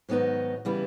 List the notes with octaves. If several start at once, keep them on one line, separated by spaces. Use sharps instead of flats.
G#2 D#3 F#3 B3 D#4
C#3 E3 G3 B3 E4